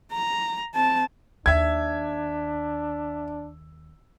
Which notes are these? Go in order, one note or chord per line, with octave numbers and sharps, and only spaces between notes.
A#5
C4 A5
D#2 D4 E5 G#6